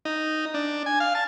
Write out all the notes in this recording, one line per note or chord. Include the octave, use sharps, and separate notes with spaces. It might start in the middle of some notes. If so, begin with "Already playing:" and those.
D#4
D4
G#5
F5
A5